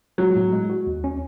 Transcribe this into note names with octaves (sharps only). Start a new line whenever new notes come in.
F#3 G#3
A2
G#3
F#4
D#2
C#4